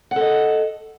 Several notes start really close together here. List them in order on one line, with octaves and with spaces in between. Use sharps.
F#5 A4 D#5